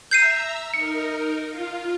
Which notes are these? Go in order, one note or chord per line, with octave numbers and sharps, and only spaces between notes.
E5 A#5 E6 G6 C7 D#7
D#4 A#4 C#7
F4